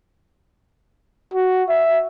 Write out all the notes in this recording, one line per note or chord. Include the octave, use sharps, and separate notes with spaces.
F#4
E5